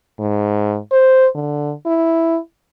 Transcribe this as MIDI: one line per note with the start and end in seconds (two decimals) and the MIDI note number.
0.20 0.77 44
0.92 1.27 72
1.35 1.73 50
1.86 2.38 64